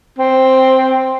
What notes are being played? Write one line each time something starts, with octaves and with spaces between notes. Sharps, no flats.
C4